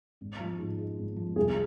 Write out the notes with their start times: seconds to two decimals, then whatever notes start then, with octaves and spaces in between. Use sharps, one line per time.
0.21 G#1
0.40 F3
0.58 G#2
0.78 G#3
0.98 G#1
1.16 F3
1.36 C2 G#4